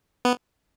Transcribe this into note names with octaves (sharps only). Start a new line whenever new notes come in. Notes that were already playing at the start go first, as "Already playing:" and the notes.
B3